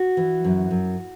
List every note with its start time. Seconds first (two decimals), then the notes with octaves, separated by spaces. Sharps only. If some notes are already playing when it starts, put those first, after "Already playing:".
Already playing: F#4
0.17 E3
0.44 F#2
0.71 F#2